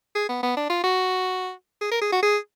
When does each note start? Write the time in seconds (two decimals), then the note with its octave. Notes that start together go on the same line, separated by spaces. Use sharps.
0.15 G#4
0.29 B3
0.43 B3
0.57 D4
0.70 F4
0.84 F#4
1.81 G#4
1.91 A#4
2.01 G#4
2.12 F#4
2.23 G#4